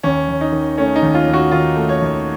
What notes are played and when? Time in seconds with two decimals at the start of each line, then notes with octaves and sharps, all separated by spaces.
0.03 D#2 C#4
0.28 D#2
0.41 D#4
0.52 D#3
0.78 A3 C#4
0.96 D#4
1.02 D#2
1.14 F4
1.27 D#2
1.33 F#4
1.51 D#3 F4
1.76 A3
1.89 C#5
2.02 D#2